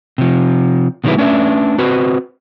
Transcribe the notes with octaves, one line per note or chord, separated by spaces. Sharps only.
C3 F3
B2 D#3 F#3 G#3 E4 B4
A3 C#4 D4 B4 E5
C4 F#4 B4 C5